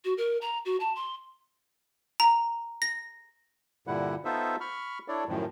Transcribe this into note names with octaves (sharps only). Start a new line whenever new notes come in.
F#4
A#4
A#5
F#4
A5
C6
A#5
A#6
G2 A#2 D3 G3 E4 F#5
B3 D#4 F4 A4 C5 E5
B5 C#6 F6
D4 E4 A4 C#5 D5
F#2 A2 D#3 F3